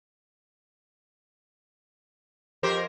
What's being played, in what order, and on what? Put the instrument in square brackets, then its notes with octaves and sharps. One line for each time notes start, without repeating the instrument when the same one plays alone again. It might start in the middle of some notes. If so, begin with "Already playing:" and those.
[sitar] F2 A#4 C5 [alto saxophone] G4